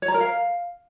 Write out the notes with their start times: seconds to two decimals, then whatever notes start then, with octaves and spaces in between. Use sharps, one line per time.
0.02 C#5
0.08 A#5
0.14 A#4
0.20 F5